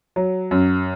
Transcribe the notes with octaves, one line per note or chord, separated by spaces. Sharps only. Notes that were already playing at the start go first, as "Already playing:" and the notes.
F#3
F#2